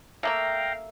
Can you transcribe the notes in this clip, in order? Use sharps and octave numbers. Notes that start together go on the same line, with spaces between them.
A3 A#3 E5 F5 G5 A#5